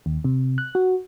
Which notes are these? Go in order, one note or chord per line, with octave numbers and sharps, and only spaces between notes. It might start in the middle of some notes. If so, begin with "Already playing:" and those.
D#2
C3
F#6
F#4